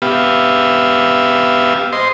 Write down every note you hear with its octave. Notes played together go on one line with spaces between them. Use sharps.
B3 G4 E5 F5
C5 D#5 C6